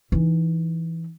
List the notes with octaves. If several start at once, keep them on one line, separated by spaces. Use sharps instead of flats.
E3 D#4